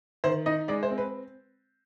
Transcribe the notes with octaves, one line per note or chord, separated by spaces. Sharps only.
D#3 C5
D#4 D#5
G#3 D5
C5
C4
B4